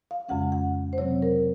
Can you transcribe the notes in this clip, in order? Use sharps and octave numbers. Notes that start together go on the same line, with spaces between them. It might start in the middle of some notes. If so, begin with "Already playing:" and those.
F5
F2 C#3 G#3 C#4 F#5
F#5
C5
C3 F#3 C4 C#5
A#4